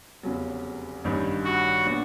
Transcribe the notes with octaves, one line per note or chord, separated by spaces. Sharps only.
F1 E2 C#3 F#3
A1 G2 D#3 G3
F#4
A#2 F#3 B3 D4